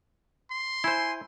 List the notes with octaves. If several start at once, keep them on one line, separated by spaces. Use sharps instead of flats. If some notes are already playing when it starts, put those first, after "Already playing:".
C6
E4 C5 G#5